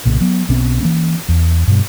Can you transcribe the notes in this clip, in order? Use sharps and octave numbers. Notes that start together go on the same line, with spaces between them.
B1 A#2 C#3
F#3 B3
B1 B2 C4 C#4
E3 A#3 C#4
E2
G2 B2 G3